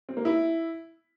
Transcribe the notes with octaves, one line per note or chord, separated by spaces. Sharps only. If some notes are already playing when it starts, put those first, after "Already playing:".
C4
A#3
E4